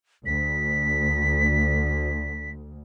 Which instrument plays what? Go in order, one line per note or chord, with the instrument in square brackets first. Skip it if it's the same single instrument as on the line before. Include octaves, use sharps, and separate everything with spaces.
[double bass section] D2 [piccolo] B6